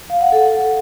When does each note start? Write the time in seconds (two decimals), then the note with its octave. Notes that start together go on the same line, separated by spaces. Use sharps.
0.10 F5
0.21 F#5
0.32 A4